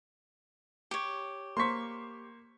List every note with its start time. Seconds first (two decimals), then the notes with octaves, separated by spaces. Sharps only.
0.91 G4 C#5
1.57 A#3 C5 C6 C#6 B6